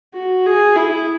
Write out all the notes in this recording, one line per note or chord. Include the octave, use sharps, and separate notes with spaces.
F#4
G#4
E4